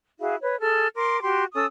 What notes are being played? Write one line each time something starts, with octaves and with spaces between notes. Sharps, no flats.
E4 F#4 G#4 F5
B4 C#5
G#4 A4 F6
A#4 C6 D6
F#4 G4 C6
C#4 A4 D#6 E6